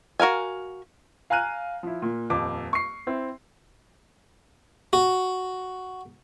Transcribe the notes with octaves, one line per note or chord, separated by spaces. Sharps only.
F#4 A#4 F5 G#5
F5 G#5 A#5 F6 F#6 D#7
F3 E4
A#2
D#1 F2 D6
C#6 C7
C4 E4
F#4